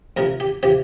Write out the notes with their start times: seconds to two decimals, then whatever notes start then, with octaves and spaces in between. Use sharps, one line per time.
0.17 D2 C3 F3 A#4
0.40 G4
0.63 C3 F3 G4